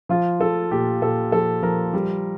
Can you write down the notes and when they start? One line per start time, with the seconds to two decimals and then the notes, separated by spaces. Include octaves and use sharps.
0.09 F3 F4
0.40 F3 A4
0.71 A#2 G4
1.02 A#2 A4
1.32 F3 A4
1.62 F3 A#4
1.93 G3